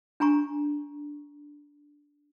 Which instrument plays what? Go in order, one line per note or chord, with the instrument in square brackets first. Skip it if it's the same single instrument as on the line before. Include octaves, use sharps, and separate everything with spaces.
[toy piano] D4 G#5 A#5 C#6